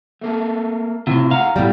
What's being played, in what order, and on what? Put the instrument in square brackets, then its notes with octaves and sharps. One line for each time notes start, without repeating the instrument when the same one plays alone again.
[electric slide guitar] A3 A#3 A4
[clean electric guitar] A2 C3 [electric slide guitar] E4 F4
[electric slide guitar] A2 F#5 A#5 [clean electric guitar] F5
[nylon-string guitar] A2 G3 [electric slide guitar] F#3 B3